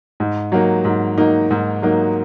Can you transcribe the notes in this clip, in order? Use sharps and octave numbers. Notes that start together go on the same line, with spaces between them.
G#2
F#3 A#3 D#4
G#2
F#3 A#3 D#4
G#2
F#3 A#3 D#4